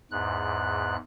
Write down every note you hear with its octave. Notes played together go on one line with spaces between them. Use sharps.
E2 G#2 F#6